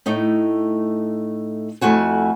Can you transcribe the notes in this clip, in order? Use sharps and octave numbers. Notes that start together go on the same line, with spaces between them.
A2 A3 D#4
F2 A3 E4 F#4 G#5